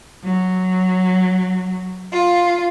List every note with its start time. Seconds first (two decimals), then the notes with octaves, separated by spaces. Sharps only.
0.24 F#3
2.12 F4